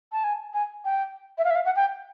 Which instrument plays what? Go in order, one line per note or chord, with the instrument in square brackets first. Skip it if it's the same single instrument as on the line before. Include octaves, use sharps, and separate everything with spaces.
[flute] A5
G#5
G#5
G5
E5
F5
E5
F5
F#5
G5